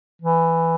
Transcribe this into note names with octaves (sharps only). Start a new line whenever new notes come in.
E3